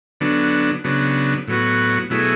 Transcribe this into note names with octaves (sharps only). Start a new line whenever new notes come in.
D3 F#3 B3 D4
C#3 F#3 B3 D4
A2 F#3 B3 F#4
B2 F#3 A3 E4 G#4